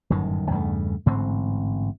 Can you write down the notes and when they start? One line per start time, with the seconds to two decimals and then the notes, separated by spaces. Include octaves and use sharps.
0.10 G1 F#2 A2 D#3
0.50 E2 G2 C#3 A3
1.06 A1 G#2 D3 C4